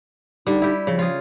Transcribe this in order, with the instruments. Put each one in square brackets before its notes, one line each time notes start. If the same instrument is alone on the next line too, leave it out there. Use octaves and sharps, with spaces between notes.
[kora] D3 G3 [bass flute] D#4
[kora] E4 G4
[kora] C#3 [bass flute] F3
[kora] F4 G#4